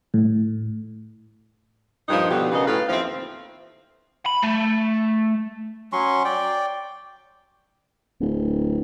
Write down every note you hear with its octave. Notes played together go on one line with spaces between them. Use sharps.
A2
G2 A#2 F3 D#4
B2 D3 F3 G4 B4
C#3 B3 A#4 D#5 F5
A2 B4 F5
D#2 F3 C4 E5 F5
B5
A3
F#3 C#4 C6 C#6
D5 G5
D1